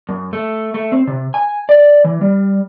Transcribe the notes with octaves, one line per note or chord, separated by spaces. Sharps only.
F#2
A3
A3
C4
C3
G#5
D5
E3
G3